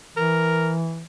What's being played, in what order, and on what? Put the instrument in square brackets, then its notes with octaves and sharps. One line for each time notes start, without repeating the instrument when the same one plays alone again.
[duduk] E3 [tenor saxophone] A#4